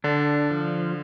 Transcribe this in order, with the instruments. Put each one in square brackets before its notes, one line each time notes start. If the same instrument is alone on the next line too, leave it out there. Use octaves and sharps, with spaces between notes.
[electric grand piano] D3 [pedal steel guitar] D4
[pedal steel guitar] F3